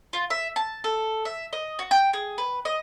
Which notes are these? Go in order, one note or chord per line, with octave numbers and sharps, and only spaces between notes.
F4
E5
A5
A4
E5
D#5
F#4
G5
G#4
B4
D#5